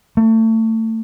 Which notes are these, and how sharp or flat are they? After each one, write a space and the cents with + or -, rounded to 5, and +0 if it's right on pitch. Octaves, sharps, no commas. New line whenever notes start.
A3 +30